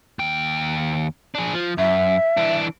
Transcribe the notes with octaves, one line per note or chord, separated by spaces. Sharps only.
D#2 G5
D4 G#4
F3
F#2 E5
E3 D4